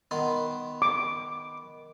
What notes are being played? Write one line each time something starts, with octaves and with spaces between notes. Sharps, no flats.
D#3 B3 C6
D6